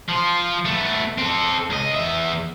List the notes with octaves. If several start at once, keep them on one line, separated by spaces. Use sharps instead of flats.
F3 F4
A3 B3
C4 A4
C#2 D#5
E2 E5